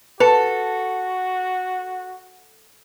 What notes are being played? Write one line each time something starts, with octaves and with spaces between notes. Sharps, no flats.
F#4 A4 B4